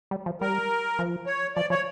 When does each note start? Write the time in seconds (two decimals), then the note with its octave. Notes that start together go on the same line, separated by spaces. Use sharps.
0.11 G3
0.26 F3
0.41 G3 A#4
0.99 F3
1.27 C#5
1.56 F3 D5
1.70 F3 C#5